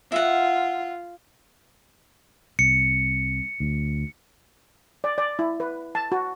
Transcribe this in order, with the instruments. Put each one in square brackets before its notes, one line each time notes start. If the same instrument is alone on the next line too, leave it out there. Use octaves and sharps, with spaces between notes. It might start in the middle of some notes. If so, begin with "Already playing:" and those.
[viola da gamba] F4 [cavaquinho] E5 F#5
[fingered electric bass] C2 [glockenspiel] C#7
[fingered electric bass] D2
[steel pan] D5
D5
E4
B4
A5
F#4